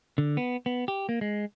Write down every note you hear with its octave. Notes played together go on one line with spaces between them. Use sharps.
D3
B3
B3
G4
A#3
G#3